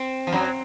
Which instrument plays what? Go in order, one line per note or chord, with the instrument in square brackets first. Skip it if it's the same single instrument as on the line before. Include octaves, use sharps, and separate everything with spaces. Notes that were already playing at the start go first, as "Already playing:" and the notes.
Already playing: [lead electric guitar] C4
[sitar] F3
F#2 F#3